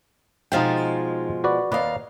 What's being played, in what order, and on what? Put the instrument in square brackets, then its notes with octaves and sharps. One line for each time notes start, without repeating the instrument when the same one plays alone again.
[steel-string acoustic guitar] B2 F3 G#3 [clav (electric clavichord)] D#4 F5 G5
[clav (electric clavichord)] F#4 B4 D5
[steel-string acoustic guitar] D#2 F5 [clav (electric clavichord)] B4 D5 D#5